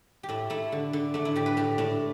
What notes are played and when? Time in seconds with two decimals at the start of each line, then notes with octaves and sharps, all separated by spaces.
0.23 G4
0.29 A2 E4
0.50 A3 E4
0.72 D3
0.93 D3
1.14 A3 D4
1.25 E4
1.36 A2 G4
1.46 B4
1.57 A2 G4
1.78 A2 D4